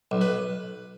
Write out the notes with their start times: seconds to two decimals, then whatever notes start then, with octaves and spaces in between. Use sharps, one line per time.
0.11 B1
0.21 B4